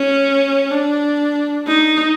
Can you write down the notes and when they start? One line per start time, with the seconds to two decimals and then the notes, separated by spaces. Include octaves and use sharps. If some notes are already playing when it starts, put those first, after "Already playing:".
Already playing: C#4
0.71 D4
1.68 D#4